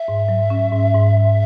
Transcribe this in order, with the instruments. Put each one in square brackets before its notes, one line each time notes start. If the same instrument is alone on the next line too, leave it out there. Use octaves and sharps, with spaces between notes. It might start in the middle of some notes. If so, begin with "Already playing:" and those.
Already playing: [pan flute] E5
[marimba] G#2
F#3
C#4
G#2
G#2
F#3